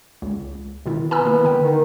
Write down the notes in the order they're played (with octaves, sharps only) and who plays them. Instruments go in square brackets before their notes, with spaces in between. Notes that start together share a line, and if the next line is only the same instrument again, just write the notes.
[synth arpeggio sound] C#2
B2 D#3 E4
[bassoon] B3 [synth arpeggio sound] G#5 A#5 E6
[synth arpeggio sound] D#3 A#3 E4
D3 G5
[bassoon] D#3